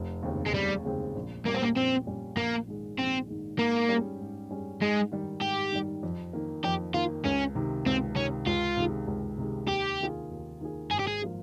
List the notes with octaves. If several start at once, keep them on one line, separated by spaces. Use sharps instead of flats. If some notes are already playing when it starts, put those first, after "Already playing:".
Already playing: F1
D#2 C#3 G#3 C4
G#3
F1 G3
D#2 C#3 G#3 C4
A#1
A#2 G3 A#3 C#4
C4
A#3
A#1 C4
A#2 G3 C#4
A#1 A#3
G#2 D#3 G#3
A#1 C4
G#2 D#3 G#3
G#2 A#3
G3 C#4 G#4
G#2
G3 C#4 G#4
G#2 G#3
D#3 G3
G#2 G4
D#3 G3
F2
D#3 A#3
F2 G4
D#3 A#3 F4
C#2 C#4
C3 D#3
C#2 C4
C3 D#3 C#4
C#2 F4
C3 D#3 G#3
C#2
C3 D#3 G#3
D#2 G4
D#3 A#3 F4 G#4
D#2
D#3 A#3 F4 G#4
G#1 G#4
G4
G#4
F3 A#3 F4